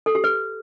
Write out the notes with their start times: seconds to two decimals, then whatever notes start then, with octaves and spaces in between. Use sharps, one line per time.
0.06 A4
0.15 G4
0.24 B4